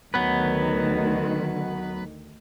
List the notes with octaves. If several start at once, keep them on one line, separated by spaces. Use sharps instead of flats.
D2 D#3 F#3 B3 B4